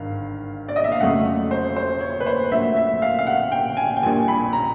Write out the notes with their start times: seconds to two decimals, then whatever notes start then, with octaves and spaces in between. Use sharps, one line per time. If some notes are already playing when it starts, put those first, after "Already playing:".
Already playing: G#1 G2 D#3 F5
0.69 D5
0.76 D#5
0.84 E5
0.92 F5
1.00 F2 C#3 F#3 A3 F#5
1.51 C5
1.77 C5
2.01 C#5
2.20 B4
2.26 C5
2.51 A#1 A#2 F#3 A3 E5
2.76 E5
3.02 F5
3.19 F5
3.27 F#5
3.52 G5
3.77 G#5
3.97 G5
4.02 A#1 A#2 G3 G#5
4.28 B5
4.53 A#5